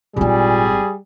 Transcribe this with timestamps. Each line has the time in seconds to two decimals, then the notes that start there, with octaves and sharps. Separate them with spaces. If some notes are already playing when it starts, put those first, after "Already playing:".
0.16 G#1 A#2 G3 E4 G#4